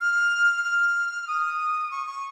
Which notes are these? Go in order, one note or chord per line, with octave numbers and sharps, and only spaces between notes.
F6
F6
D#6
C#6
C#6